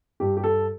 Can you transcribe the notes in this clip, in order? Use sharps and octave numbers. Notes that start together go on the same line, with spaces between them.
G2 G4
G4
A4